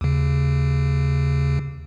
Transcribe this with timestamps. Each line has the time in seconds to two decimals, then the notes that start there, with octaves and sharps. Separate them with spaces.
0.01 D#2 C#3